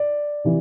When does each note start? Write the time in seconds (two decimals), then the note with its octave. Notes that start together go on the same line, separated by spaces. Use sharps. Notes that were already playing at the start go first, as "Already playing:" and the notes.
Already playing: D5
0.44 C3 E3